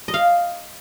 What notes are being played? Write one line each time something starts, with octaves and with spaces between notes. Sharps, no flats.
D#5
F5